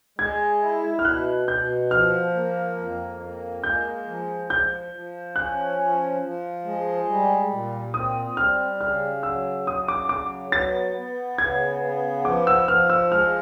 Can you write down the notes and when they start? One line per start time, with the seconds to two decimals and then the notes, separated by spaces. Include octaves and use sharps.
0.19 G#3 G#6
0.62 E4
0.99 F6
1.05 B2 F#6
1.48 B2 G6
1.91 F3 F6
2.34 A#3
2.77 F2
3.21 A#3
3.63 G#3 G6
4.06 F3
4.50 F3 G6
4.93 F3
5.35 C#4 F#6
5.79 F3
6.22 F3
6.65 G#3
7.09 G3
7.51 A#2
7.94 C4 D#6
8.37 G3 F6
8.81 C#3 F6
9.23 F#3 E6
9.67 C#3 D#6
9.88 D6
10.09 F#3 D6
10.52 B3 A6
10.96 B3
11.38 C#3 G#6
11.82 B3
12.25 F3 D6
12.47 E6
12.68 F3 F6
12.90 E6
13.11 G#3 F6